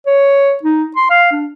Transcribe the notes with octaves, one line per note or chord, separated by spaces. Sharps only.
C#5
D#4
C6
F5
D4